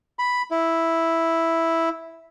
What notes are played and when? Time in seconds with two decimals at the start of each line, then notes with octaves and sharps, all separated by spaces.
0.19 B5
0.51 E4